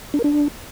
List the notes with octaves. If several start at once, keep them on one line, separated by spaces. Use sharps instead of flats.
D4
A#4
D4